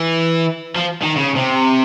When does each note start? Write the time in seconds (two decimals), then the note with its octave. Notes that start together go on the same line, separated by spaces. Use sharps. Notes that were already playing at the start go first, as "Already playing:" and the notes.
Already playing: E3
0.75 F3
1.02 D#3
1.16 C#3
1.35 C3